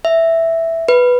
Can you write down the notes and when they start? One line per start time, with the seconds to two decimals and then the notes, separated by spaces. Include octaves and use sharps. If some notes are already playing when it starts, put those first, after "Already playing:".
0.05 E5
0.89 B4